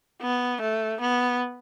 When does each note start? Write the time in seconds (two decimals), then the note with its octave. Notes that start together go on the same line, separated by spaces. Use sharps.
0.22 B3
0.61 A3
1.01 B3